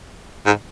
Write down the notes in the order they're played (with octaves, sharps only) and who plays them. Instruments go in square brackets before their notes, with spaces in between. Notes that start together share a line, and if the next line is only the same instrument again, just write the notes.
[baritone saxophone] G#2